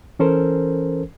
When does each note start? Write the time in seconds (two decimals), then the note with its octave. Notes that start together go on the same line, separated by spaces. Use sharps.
0.19 E3 C#4 A4 A#4 C5